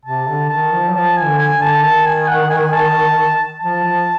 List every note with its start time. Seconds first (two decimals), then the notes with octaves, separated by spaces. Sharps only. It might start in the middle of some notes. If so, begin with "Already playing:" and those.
0.05 C3 A5
0.28 D3
0.49 D#3 A5
0.72 F3
0.89 F#3
0.95 F3 A5
1.17 G#5
1.24 D3
1.38 G#5
1.54 D3
1.62 A5
1.83 D#3 A5
2.06 G#5
2.27 F#5
2.50 G#5
2.73 A5
3.61 F3 A5
3.84 F3